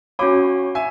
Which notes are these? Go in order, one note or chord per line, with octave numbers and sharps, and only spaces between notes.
C#4 F#4 C#5 B5 D6
E5 G#5